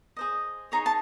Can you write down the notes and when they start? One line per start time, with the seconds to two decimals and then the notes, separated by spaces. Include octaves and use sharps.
0.17 G#4 C5 D#5
0.72 D#4 G#4 C#5 A#5
0.86 A5